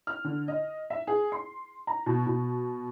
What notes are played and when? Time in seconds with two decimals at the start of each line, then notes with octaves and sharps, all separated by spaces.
0.07 F6
0.24 D3
0.48 D#5
0.90 E5
1.07 G#4
1.32 C6
1.87 A#5
2.06 B2
2.26 B2